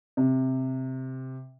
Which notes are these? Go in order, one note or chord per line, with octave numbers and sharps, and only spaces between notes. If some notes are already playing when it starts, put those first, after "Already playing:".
C3